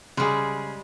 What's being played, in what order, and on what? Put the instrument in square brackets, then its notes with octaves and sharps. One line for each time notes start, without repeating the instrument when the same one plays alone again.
[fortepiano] C#3 G#4 [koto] G3 G#3